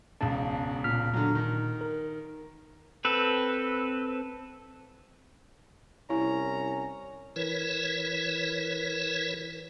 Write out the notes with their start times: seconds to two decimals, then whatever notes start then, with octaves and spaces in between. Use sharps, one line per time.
0.21 E1 C#2 A5
0.84 A#2 F6 B6
1.13 D3 F#3
1.35 D#3
1.81 A#4
3.05 C4 A4 B4
6.10 C2 C#4 E4 A#5
7.36 E3 E4 A#4 B4 C#5